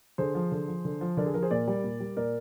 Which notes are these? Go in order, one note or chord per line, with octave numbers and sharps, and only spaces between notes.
D3 G#4 C5
F3
D3
F3
D3
F3
D3 A#4 D5
G#4
F3 A#4
G#4 C5
A#2 A#4 D5
G3
A#2
G3
A#2 A#4 D5